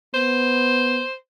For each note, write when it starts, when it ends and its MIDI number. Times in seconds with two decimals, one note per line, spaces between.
0.14 1.02 59
0.14 1.14 72